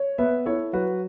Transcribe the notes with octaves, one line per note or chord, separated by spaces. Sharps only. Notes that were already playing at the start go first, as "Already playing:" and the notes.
Already playing: C#5
B3 B4 E5
E4 A4 C#5
F#3 F#4 B4